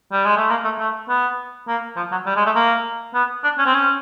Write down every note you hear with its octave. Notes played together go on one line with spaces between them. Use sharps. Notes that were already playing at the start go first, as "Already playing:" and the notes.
G3
G#3
A3
A#3
A3
A3
B3
A#3
F3
F#3
G3
G#3
A3
A#3
B3
D4
C#4
C4
C#4